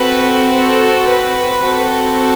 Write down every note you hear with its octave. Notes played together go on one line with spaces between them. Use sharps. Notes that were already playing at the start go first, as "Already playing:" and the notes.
Already playing: C4 F#4 A4 B4
A4
B4
C4 F#4 A4